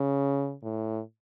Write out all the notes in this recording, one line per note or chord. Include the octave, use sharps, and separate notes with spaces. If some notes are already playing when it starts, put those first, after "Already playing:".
Already playing: C#3
A2